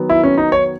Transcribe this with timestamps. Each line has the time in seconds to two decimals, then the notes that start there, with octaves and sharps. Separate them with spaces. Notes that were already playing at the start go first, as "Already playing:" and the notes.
Already playing: D#3 F#3 B3
0.10 E4
0.23 C#4
0.38 D#4
0.52 C#5